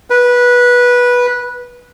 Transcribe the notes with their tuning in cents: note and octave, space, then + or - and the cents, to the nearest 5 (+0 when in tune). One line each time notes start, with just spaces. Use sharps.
B4 -15